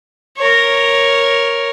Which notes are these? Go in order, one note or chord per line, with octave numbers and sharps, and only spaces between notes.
A#4 C#5